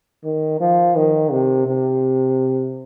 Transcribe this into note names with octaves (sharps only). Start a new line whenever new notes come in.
D#3
F3
D#3
C3
C3